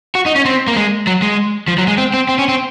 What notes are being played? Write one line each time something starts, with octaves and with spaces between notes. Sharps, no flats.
F#4
D#4
C#4
C4
A#3
G#3
F#3
G#3
F3
F#3
G#3
C4
C4
C4
C#4
C4